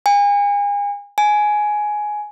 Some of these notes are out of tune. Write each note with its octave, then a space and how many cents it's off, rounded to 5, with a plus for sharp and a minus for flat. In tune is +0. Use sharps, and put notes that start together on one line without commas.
G#5 -40
G#5 +10